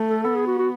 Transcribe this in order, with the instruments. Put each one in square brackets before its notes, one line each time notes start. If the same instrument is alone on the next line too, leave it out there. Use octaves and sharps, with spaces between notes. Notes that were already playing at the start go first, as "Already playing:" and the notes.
Already playing: [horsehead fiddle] A3
[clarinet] A4
[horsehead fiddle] B3 [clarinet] A4
[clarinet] G#4
F#4
F#4